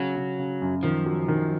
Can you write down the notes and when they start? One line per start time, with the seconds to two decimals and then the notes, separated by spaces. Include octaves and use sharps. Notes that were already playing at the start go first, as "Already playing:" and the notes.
Already playing: C#3 F#3
0.16 C#3
0.39 C#3
0.62 F#2
0.83 D#3 F3
1.06 F#3
1.28 D#3